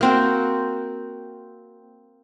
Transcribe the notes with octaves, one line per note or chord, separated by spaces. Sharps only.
A#3 C4 F#4